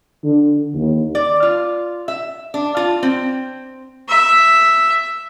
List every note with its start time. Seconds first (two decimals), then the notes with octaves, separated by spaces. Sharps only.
0.24 D3
0.74 D#2
1.15 D5
1.43 F4
2.08 E5
2.54 D4
2.77 F4
3.03 C4
4.08 E5